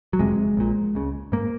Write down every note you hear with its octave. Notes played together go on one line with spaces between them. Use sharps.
F#3
F1 F2 C3 G#3
A#1 A#2
C#2 C#3
G#2 A#3